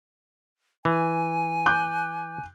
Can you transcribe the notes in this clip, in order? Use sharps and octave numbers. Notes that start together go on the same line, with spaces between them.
E3 G#5
D6 F#6 G6